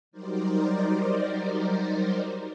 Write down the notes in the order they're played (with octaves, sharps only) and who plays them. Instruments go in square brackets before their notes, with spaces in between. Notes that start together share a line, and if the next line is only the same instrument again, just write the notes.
[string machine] F#3 G3 D#4 A#4 C5 D5